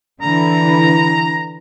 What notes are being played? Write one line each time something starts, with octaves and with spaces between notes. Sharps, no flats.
D3 E3 A#5